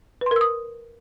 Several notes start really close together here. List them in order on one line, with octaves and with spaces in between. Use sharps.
B4 C6 A#4 E6 D#6